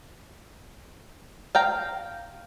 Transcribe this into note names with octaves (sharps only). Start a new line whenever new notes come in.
F5 G5 A#5